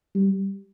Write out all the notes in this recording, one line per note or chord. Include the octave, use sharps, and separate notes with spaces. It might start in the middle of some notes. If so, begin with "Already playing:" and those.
G3